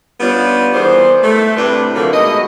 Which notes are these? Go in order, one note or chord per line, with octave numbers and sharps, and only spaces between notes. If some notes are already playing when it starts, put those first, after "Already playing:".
G3 B3 C#4 D4 F4
D#3 E3 G3 B3 G#4 C5
A3
A2 C3 D4 G4 B4
D3 F3 F#3 A3 A#3
G#2 B2 A3 D#5